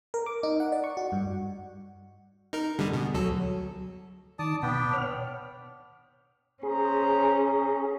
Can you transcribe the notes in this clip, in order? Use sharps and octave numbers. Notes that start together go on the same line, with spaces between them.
A#4
D6
D#4
F#5
D5
C#6
F#4
G2
D#4 A#4
D3 G3 G#4
B2
D2 F#3 A4
D#3 D5 A5 D#6
B2 B3 D4 G5 B5
C#5 F6
C#4 G#4 C5 A#5